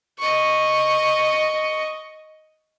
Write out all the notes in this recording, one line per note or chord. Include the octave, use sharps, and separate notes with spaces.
D#5 C#6